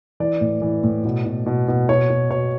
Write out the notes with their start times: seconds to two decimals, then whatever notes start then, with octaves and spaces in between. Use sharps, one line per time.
0.20 E3 D5
0.41 A2
0.62 E3
0.84 A2
1.05 B2
1.25 B2
1.46 B2
1.68 B2
1.89 B2 C#5
2.09 B2
2.30 B2 C#5